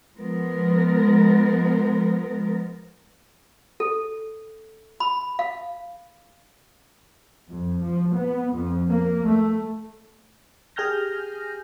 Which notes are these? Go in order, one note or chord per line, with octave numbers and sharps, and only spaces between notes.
F3 G#3 B3 A#4
A4
B5
F5
F2
F3
B3
F2
A#3
A3
G4 G#4 G#5 F6 G6 A#6